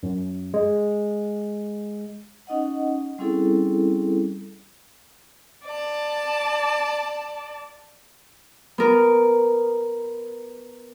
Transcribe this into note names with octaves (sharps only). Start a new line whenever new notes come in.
F#2
G#3
C#4 D#4 D#5 F#5
G3 C4 C#4 E4 G#4 A4
D5 A5
B3 A#4